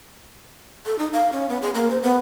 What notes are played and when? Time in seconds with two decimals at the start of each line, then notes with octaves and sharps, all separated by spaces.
0.86 A4
0.99 D#4
1.13 F5
1.32 C#4
1.49 B3
1.62 G#4
1.75 A#3
1.90 C5
2.03 B3